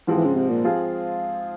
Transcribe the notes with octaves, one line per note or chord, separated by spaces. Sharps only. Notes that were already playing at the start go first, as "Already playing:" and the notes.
G#2 E3 F3 G#3 C4
E3
C#3
C3
A#2
F3 C4 F4 G#4